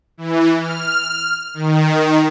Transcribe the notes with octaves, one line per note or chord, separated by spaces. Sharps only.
E3
F6
D#3